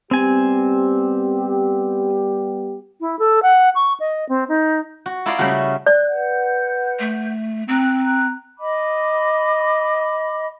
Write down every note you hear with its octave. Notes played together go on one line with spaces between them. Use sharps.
G3 B3 C4 G4 G#5
E4
A4
F#5
C#6
D#5
C4
D#4
F#4
E4 F4 A#4 D5 D#5 F5
C#3 G3 A3 C#4 F#4
D5 F#6
B4 F#5 G6
A3
C4 A#5 F#6
D#5 B5 D6